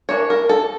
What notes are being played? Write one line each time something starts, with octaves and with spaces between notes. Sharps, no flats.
E3 A#3 D4 C#5
A#4
A4